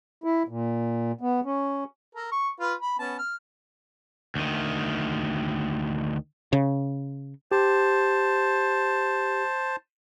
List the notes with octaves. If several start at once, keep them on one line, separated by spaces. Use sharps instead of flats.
E4
A#2
B3
C#4
A4 A#4
C#6
F4 B4 F5
B5
B3 C#4 A5
F6
D2 D#3
C#3
G4 C5 A5